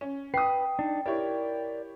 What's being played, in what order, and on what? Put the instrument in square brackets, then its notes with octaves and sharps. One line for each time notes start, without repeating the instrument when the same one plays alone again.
[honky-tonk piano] C#4
[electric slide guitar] B4 [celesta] G5 [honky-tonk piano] D#6 C7
[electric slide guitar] D4 D#4
[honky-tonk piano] E4 G4 C#5 [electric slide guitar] A#4 D5